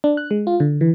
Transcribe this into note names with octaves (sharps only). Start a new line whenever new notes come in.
D4
F#6
G#3
F4
D3
E3